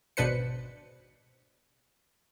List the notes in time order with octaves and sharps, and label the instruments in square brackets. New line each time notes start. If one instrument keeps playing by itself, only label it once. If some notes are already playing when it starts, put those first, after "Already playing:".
[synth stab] G#1 B2 D4 B4 C5 C#7